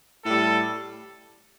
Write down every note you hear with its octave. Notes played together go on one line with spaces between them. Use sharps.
A2 G3 A4